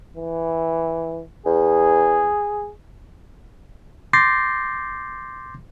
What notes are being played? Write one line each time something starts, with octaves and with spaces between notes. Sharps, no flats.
E3
E2 G#4
C6 D6 G6 A6 A#6 C7